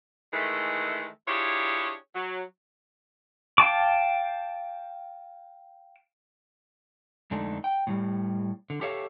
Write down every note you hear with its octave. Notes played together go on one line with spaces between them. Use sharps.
D#3 E3 G#3 A3
D4 E4 F4 G4 G#4 C#5
F#3
F5 G5 A5 D6
F2 D3 G#3 A3 D4 D#4
G5
A2 E3 G3
D3
G4 A4 C#5 E5 F5